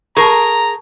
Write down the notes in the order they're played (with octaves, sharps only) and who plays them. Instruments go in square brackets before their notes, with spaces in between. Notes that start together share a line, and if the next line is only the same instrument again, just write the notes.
[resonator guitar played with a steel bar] G#4 A#4 [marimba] A5 C#6 [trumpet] A#5